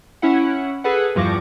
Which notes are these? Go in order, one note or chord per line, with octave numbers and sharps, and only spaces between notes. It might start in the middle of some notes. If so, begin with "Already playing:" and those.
C#4 E4 F#5
G#4 A4 B4 F#5
E2 G2 F3 C#6 D6 A#6